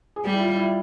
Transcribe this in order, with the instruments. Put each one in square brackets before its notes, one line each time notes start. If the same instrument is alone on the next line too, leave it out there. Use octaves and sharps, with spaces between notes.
[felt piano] G#4
[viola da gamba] G3 [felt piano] G4
[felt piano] E4
F4
E4